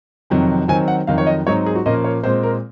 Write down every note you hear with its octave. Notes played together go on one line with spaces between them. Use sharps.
F2 C3 D#3 F#3
D#3 F#3 C4 G#5
F#5
F2 D#3 F#3 F5
C#5
D#5
G#2 F#3 C4 D#4 C#5
G#4
F#4
A#2 F3 A#3 C#4 D#5
C#5
A#2 G#3 C4 C5
A#4